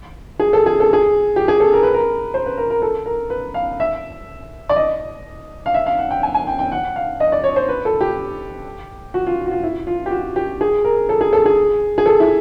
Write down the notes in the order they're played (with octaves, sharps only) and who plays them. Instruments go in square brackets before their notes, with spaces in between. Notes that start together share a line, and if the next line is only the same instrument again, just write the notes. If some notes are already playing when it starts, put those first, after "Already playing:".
[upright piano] G#4
A4
G#4
A4
G#4
G4
G#4
A4
A#4
B4
A#4
C5
B4
A#4
A#4
A4
A#4
B4
F5
E5
D5
D#5
F5
E5
F5
F#5
G5
G#5
G#5
G5
G5
F#5
F5
D#5
D5
C#5
C5
B4
A4
G4
F#4
F4
F#4
F4
E4
F4
G4
F#4
G4
G#4
A#4
A4
G#4
A4
G#4
G#4
A4
E4